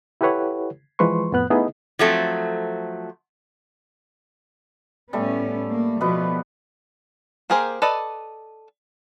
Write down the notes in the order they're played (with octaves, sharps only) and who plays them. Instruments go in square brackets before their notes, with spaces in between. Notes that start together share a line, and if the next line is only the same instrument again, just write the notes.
[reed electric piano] E4 G4 A4 B4 C#5 F#5
E3 F3 G#3 B4 C6 C#6
F2 A2 B3 F#6
A3 B3 D#4 E4 G#4 D#5
[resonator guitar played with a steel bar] F3 F#3 A3 C4
[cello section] A2 B3 C#4 [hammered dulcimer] G3 A3
[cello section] A#3
[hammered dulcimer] B2 B4 [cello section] F3 B3
[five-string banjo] A#3 G4 G#4 A#4 C5
A4 B4 D5 D#5